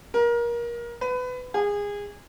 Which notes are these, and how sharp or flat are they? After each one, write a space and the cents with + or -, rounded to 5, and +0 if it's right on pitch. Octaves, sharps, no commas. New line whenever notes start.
A#4 +25
B4 +25
G#4 -25